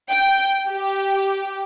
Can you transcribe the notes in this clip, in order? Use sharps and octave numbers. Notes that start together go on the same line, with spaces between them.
G5
G4